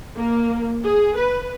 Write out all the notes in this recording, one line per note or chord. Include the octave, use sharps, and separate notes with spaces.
A#3
G#4
B4